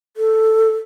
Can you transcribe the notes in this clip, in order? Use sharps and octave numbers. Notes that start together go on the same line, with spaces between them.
A4